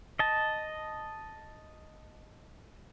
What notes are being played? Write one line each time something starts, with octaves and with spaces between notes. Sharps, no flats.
D#5 A5